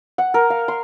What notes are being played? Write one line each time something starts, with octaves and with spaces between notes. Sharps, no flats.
F#5
A#4
F5
C6